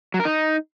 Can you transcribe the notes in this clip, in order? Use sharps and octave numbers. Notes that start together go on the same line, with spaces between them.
F#3
A#4
D#4